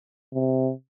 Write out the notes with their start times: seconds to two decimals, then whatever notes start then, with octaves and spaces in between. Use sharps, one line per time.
0.34 C3